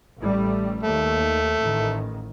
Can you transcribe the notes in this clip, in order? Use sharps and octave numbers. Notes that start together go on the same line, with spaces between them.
A1 G3 A3
D#2 A3
A1 D#3